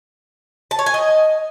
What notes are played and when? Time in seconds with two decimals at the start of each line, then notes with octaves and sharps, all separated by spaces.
0.71 A5
0.79 C#5
0.86 G#5
0.94 D#5